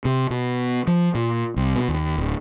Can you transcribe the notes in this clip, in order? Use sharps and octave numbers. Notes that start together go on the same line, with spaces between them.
C3
B2
F3
A#2
C2
B2
D#2
D1